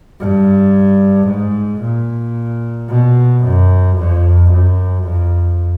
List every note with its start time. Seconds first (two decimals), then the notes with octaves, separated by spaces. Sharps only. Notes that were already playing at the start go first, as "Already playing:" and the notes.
0.20 G2
1.28 G#2
1.82 A#2
2.90 B2
3.44 F#2
3.98 F2
4.51 F#2
5.04 F2